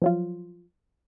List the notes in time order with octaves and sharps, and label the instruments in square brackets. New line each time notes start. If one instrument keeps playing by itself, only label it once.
[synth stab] F3 F#3 F4